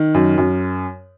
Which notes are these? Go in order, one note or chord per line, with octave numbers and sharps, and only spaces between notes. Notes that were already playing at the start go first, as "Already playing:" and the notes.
Already playing: D#3
F#2
F#2